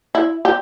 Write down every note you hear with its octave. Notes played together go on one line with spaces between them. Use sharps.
E4
G4